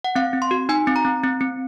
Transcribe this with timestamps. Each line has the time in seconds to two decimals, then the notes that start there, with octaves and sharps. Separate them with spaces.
0.04 F#5
0.16 C4 F5
0.33 C4
0.42 C6
0.51 F#4
0.69 D#4 G#5
0.87 C4
0.96 A#5
1.05 C4
1.23 C4
1.41 C4